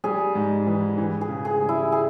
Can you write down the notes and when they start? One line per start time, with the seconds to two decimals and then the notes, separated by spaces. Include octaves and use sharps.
0.04 G3 G#4
0.35 G#2
0.66 E3
0.98 E3
1.21 G#4
1.29 C#3
1.45 G#4
1.60 G3
1.69 E4
1.92 G#4